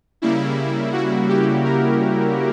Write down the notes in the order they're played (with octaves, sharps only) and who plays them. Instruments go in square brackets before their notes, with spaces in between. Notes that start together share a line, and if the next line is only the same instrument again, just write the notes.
[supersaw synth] C#3 G3 A#3 E4
F#4
G4
A#4